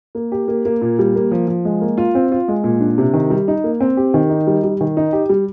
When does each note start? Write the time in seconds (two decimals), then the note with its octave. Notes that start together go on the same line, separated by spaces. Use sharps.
0.15 A#3
0.32 G4
0.48 A#3
0.65 A#3
0.82 A#2
0.99 G3
1.15 A#3
1.31 F3
1.48 F3
1.65 G#3
1.81 A#3
1.98 F4
2.15 C4
2.32 F4
2.48 G#3
2.64 A#2
2.81 D4
2.98 C3
3.13 D#3
3.30 G3
3.48 D#4
3.64 A#3
3.80 C4
3.97 G4
4.14 D#3
4.30 D#4
4.47 G3
4.64 G3
4.81 D#3
4.97 D#4
5.13 G4
5.29 G3